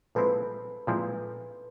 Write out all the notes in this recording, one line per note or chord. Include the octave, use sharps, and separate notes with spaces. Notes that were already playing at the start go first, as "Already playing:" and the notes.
A#2 F3 G#3 C4 E4 A4 B4
A#2 F3 G#3 C4 E4